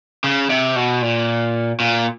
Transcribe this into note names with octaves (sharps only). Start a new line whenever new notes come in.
C#3
C3
B2
A#2
A#2